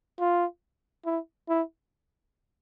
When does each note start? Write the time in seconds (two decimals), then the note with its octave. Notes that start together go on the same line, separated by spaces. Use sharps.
0.19 F4
1.05 E4
1.49 E4